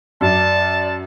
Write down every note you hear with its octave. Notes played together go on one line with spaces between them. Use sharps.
F#2 D5 A5